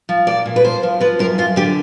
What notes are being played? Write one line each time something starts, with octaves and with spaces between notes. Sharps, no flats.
F3
A#2 D5
A#2
B4
F3 C5
F3
F3 B4
F#2 A#4
F#2 F4
D3 G4